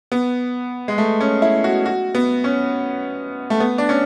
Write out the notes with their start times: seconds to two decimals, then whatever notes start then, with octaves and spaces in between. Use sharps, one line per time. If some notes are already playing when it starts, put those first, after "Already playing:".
0.12 B3
0.88 G#3
0.98 A3
1.21 C#4
1.42 E4
1.64 F#4
1.86 F#4
2.15 B3
2.44 C#4
3.50 A3
3.60 B3
3.78 D4
3.89 C#4